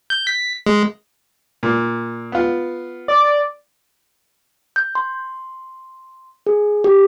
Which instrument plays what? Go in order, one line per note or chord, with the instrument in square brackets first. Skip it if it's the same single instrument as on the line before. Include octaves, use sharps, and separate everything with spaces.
[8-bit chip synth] G6
B6
G#3
[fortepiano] A#2
B3 F4
[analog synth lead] D5
[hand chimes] G6
C6
G#4
G4